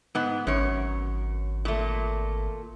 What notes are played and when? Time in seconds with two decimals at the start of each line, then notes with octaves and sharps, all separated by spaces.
0.15 G#2 B3
0.47 G#1 F#2 C#5
1.65 A#2 A3